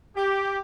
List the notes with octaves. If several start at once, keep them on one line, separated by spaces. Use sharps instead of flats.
G4